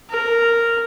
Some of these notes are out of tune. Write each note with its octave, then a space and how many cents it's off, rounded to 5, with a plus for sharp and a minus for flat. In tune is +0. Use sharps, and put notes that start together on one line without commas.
A#4 -5